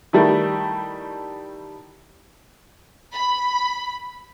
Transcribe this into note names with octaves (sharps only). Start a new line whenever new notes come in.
D#3 G3 A3 E4
B5